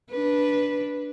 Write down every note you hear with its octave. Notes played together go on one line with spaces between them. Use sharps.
D4 B4